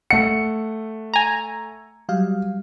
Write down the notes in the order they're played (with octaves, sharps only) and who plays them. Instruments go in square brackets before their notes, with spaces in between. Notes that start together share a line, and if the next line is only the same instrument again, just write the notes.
[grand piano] A3 F#5 [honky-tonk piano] C#7
[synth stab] G#5 A#5
[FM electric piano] F#3 G3 F5